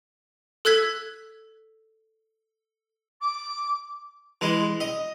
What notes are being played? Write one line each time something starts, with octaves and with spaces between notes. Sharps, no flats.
A4 E6 F#6 G#6 B6
D6
E3 G#3
D#5